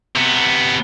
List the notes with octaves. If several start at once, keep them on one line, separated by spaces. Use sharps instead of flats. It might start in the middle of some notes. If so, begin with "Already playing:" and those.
C3 B3